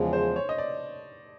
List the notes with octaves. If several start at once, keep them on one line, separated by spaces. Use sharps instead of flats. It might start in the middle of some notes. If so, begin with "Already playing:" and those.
Already playing: E2 C#3 F3 G#3
C5
C#5
D#5
D5